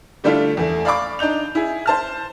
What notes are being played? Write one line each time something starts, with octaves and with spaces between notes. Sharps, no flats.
D3 G3 A3 D4 E4 F4
E2 A3
D5 F5 B5 C#6 D6
D4 D#4 G6 F7
E4 G#4
C5 A5 F6